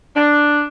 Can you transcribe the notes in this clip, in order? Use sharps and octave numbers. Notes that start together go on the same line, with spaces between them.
D4